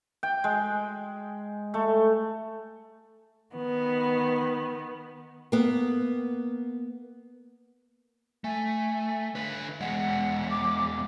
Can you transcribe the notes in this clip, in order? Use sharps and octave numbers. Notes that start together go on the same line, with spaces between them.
G5
G#3
A3
D#3 B3
A#3 B3
A3 G#5
D3 B4
E2 G#3 F#5
D6